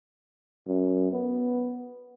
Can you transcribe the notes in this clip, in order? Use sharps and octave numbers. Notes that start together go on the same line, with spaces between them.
F#2
B3